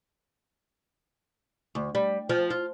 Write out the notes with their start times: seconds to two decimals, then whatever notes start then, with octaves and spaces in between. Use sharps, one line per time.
1.75 D2
1.95 G3
2.29 F3
2.50 F4